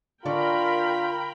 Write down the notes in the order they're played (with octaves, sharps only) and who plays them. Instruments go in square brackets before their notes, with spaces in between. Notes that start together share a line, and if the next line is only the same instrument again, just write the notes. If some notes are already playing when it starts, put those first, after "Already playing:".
[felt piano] D3 D5 C#6 [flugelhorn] F4 [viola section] A#4 G5 B5